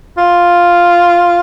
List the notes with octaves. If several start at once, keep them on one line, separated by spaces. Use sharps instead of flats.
F4